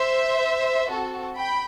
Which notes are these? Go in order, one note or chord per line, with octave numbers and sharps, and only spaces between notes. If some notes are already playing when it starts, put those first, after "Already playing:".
Already playing: C5 E5
C4 F#4 A4
G5 B5